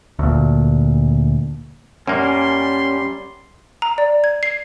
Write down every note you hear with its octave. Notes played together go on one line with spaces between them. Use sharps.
D2 A#2
F#2 G3 A#3 C#4 D5 C6
A#5
D5
G#6
C7